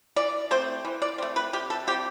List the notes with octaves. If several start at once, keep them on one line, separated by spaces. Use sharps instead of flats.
E3 D5
A3 C4 C5
E3
D5
A3 C4
B4
C3 G4
A4
G3 C4 G4